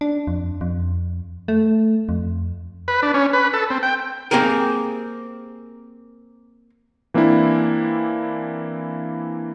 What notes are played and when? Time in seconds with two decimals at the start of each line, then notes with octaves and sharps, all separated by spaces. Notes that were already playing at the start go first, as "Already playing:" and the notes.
0.01 D4
0.27 F2
0.61 F2
1.48 A3
2.09 F2
2.88 B4
3.02 D4
3.14 C#4
3.33 B4
3.54 A4
3.70 C4
3.83 G5
4.31 A#3 C4 G4 G#4 A#4
7.14 E3 A#3 C4 D4 E4